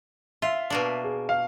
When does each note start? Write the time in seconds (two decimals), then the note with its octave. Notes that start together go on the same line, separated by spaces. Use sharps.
0.42 F4 E5
0.70 B2 A#3 D4
1.04 G#4
1.29 F5